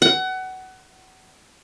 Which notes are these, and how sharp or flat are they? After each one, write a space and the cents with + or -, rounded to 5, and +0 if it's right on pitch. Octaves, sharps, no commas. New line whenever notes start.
F#5 +25